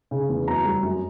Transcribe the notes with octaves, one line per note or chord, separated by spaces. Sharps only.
C#3
E2
F#2 A#5
G3
F#2